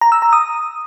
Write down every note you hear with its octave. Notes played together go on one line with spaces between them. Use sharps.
A#5
E6
A#5
D#6